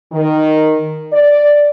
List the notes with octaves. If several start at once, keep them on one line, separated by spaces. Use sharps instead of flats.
D#3
D5